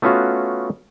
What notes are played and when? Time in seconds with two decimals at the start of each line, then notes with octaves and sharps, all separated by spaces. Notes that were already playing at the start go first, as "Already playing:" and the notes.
0.02 A3 B3 C#4 F4 F#4